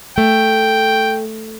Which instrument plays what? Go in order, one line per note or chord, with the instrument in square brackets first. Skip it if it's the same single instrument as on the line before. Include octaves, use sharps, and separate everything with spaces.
[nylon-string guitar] A3 [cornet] G5